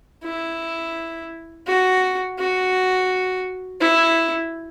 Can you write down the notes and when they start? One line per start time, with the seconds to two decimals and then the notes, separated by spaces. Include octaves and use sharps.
0.24 E4
1.67 F#4
2.39 F#4
3.81 E4